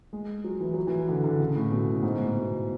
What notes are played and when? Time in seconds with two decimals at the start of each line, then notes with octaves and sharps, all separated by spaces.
0.13 G#3
0.44 F#3
0.61 E3
0.74 F#3
0.87 E3
1.08 D3
1.24 D3
1.40 C#3
1.56 A2
1.71 B2
2.03 G#2
2.19 A2
2.35 B2